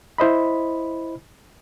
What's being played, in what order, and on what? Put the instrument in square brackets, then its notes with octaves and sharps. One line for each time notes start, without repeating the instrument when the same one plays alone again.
[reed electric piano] E4 C5 D#5 B5